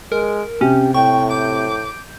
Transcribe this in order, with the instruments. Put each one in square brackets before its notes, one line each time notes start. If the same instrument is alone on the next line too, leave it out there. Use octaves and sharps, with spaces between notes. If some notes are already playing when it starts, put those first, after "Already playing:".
[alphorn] G#3 [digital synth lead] A#4
[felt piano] C3 [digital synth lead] C#4 [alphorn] G4
[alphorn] A2 [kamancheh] G5 [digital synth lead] C#6
[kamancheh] D6 [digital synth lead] G6